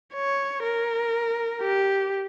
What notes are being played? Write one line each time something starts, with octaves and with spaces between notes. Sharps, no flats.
C#5
A#4
G4